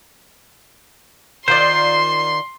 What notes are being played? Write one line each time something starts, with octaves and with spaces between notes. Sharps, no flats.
D#3 F4 C5 D5 C6